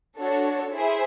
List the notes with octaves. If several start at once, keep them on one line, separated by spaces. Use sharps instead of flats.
D4 F#4 A4 C#5
E4 G#4 C5 E5